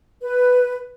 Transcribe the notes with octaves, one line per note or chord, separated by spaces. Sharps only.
B4